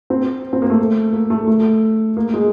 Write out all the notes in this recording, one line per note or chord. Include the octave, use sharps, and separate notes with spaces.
C4
C4
A#3
A3
A#3
A3
A3
A#3
G#3